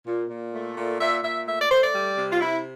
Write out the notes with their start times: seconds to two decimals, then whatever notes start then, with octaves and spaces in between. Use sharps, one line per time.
0.07 A#2
0.29 A#2
0.54 A3
0.76 A#2
1.00 A#2 E5
1.23 A#2 E5
1.47 A3 E5
1.59 D5
1.70 A3 C5
1.83 D5
1.94 G3
2.18 C3
2.32 F4
2.41 C3 E4